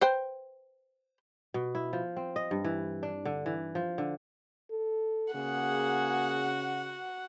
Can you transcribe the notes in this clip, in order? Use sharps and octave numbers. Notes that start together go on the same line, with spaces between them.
B4 C5 G5
B2
E4
F3
C4
D#5
G2
E3
D4
D3
E3
F3
D3
A4
C#3 A#3 F#4 G#4 F#5